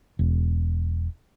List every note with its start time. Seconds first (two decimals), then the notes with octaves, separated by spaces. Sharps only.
0.19 E1